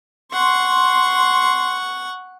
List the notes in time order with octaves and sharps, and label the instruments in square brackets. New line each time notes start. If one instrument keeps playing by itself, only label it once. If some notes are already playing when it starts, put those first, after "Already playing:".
[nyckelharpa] F#5 C#6 [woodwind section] C6